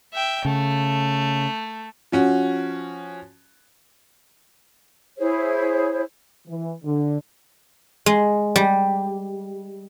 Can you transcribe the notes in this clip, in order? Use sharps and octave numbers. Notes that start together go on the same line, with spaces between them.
E5 G5
C#3 A3
F3 C#4 F#4
E4 G#4 C5 C#5
E3
D3
G#3
G3